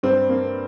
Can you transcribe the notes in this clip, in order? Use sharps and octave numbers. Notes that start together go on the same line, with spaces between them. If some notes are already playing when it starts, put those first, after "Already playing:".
G2 C4
A#3